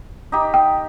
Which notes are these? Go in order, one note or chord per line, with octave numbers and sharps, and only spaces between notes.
D#4 G4
G5